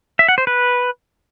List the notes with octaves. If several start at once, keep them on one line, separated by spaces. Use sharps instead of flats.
E5
F#5
C5
B4